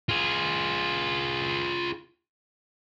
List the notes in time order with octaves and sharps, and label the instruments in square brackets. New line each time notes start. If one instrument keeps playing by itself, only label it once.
[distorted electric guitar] F4 G#4